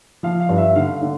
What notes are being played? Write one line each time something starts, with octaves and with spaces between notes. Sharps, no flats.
F3 F5
F5
G2
E5
D3 F5
D3